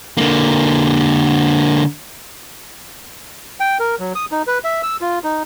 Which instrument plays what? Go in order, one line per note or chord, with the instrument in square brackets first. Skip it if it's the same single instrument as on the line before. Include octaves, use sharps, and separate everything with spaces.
[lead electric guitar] D3 A#3
[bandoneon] G5
A#4
F#3
D#6
D#4
B4
E5
E6
F4
D#4